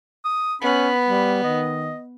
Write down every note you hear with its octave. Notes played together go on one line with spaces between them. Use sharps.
D#6
B3 C#4 B5
G3
D#3 D#5